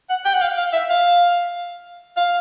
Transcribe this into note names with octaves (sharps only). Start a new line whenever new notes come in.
F#5
G5
F#5
F5
F5
E5
F5
F5